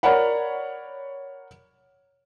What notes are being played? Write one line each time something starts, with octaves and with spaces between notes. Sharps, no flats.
A#4 C#5 D5 F#5 B5